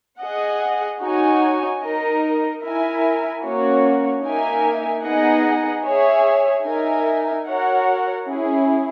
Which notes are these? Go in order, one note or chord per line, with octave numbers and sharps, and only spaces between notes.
G#4 D#5 F#5
D#4 F#4 C#5 G#5
D#4 A#4 D#5
E4 A#4 E5 G#5
A#3 C#4 F#4 C#5
A#3 D#4 A#4 E5 G#5
B3 D#4 G#4 D#5 F#5
G#4 C#5 E5
D#4 A#4 E5 G#5
F#4 A#4 C#5 F#5
C#4 E4 G#4